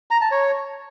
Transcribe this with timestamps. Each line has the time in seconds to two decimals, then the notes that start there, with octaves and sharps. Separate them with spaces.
0.11 A#5
0.21 A5
0.31 C#5